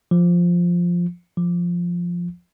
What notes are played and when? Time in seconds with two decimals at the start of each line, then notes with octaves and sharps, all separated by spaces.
0.11 F3
1.37 F3